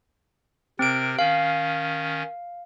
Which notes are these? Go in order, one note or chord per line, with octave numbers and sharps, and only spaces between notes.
C3 C4 A#4 D7
D#3 C#4 F5